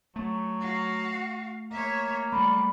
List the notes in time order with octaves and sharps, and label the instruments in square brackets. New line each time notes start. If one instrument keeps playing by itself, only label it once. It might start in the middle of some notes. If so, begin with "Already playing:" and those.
[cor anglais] F#3 [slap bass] A3
[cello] F#4 F5
[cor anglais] A#3 [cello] C#5 E5
[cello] G3 [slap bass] A3 [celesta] B5